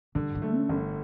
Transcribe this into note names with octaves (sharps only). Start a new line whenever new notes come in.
G2 D3
F#3
A3
C#4
G1